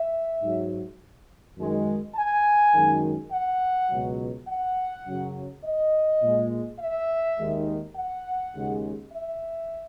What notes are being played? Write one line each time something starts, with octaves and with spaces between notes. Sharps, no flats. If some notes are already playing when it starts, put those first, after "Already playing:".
Already playing: E5
G#2 F#3
F#2 D#3 G#3
G#5
F#2 D#3 G#3
F#5
C#2 B2 F#3
F#5
F#2 C#3 F#3
D#5
A#2 G#3
E5
D#2 D#3 G#3
F#5
D#2 C#3 G#3
E5